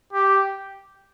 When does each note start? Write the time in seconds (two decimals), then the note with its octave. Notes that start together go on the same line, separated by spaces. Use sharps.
0.13 G4